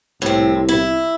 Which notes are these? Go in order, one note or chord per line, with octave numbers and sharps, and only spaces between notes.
C2 A2 C4
E4